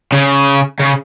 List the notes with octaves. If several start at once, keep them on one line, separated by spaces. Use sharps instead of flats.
C#3
C#3